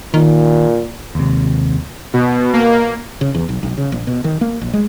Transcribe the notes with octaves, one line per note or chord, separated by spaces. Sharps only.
A#2 D#3
D#2 C3
B2
A#3
C#3
E2
B1
B1
C#3
A#1
B2
D#3
A#3
A#1
G#3